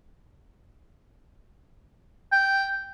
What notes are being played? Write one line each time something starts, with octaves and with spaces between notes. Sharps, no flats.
G5